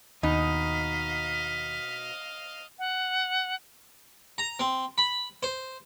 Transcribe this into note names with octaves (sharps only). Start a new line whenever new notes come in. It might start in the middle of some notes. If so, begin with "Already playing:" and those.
D#2 B2 D#4 D#5 F5 B6
F#5
A#5
C4
B5
C5